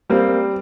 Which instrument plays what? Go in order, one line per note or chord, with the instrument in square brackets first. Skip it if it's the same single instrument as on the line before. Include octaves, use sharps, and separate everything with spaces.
[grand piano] G3 [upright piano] A#3 C4